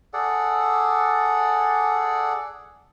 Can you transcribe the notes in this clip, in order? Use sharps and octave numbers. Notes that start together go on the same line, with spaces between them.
G#4 A4 D5 F#5